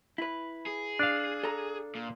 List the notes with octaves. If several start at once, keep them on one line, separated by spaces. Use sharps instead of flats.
E4 B4
G#4
D4 F5
A4 A#5
A#2